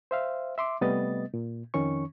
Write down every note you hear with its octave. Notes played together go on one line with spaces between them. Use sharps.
C5 E5 F5
E5 C6 D6
C3 G3 A3 B3 D#5 A6
A#2
F2 D#3 C#4 C#6